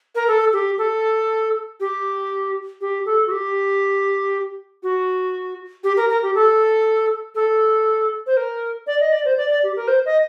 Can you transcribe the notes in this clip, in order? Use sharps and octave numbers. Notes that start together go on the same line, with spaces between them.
A#4
A4
G4
A4
G4
G4
A4
F#4
G4
F#4
G4
A#4
A#4
G4
A4
A4
C5
A#4
D5
D#5
D5
C5
D5
D5
G4
A#4
C5
D#5